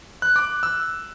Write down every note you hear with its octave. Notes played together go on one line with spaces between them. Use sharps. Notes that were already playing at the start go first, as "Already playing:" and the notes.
F#6
D6
E6